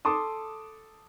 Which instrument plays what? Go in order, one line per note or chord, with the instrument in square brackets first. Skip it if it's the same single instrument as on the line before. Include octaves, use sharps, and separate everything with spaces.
[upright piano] A4 A5 C6 D6 D#6